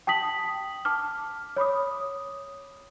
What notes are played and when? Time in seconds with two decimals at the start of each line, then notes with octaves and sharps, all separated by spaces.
0.07 G5 A5 D#6 B6 F#7
0.85 A5 D6 F6
1.56 C#5 B5 D6 D#6